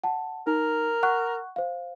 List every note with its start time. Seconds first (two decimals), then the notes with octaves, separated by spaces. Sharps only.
0.04 F#5 A5
0.47 D#4 A#4
1.03 F#5 C#6 F#6
1.56 C5 F5